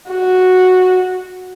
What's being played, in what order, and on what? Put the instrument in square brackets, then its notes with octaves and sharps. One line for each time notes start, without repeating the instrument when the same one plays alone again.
[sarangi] F#4